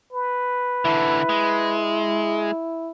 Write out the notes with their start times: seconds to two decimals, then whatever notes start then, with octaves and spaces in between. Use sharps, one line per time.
0.13 B4
0.85 D3 E3 E4
1.29 G#3